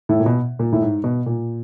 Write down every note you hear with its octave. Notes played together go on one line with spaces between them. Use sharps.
A2
A#2
B2
A#2
A2
G#2
B2
A#2